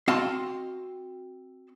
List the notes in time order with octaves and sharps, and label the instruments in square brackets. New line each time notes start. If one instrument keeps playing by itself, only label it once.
[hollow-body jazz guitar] C4 F#4 D#5 F5 A5 C6